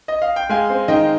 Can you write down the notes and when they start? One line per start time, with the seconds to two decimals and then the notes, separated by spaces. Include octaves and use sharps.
0.08 D#5
0.22 F5
0.36 G5
0.49 G#3 F5 G#5
0.69 C4
0.88 D#3 D#5 G5